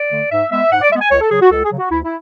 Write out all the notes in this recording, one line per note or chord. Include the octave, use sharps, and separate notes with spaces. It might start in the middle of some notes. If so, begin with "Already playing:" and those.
Already playing: D5
D3 A3
G#2 E5
G#3 B3 E5
G#2 F#5
D5
G#3 B3 E5
G#5
C#2 C#5
A4
C#3 F#3 G#4
F#4
C#2 A4
G#4
C#3 F#3
F#4
D2 E4
E4